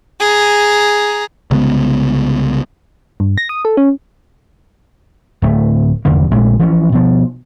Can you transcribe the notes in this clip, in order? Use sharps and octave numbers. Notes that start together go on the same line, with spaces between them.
G#4 A#5
C2 C#3 G#3 B3
G2
A#6
D#6
A4
C#4
D1 A3
F1 E2 D3 A#3
A#1 A#2 G#3 A3
E3 F3 C#4
B2 F3